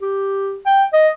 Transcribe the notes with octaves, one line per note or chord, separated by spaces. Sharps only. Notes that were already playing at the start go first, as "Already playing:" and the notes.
G4
G5
D#5